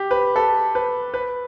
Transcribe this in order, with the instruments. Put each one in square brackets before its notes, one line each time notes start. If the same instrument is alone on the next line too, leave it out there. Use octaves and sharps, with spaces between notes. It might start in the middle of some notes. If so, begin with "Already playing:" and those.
Already playing: [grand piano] G4
B4
A4
B4
B4